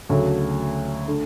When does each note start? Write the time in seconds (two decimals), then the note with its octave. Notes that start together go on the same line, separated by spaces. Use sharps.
0.09 D2 C#3 F#3 A3
1.08 D3 A3